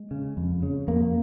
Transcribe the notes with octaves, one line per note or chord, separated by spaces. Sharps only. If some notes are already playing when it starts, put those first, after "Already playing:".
Already playing: G#3
C#3
F2
C#3
F2 A#3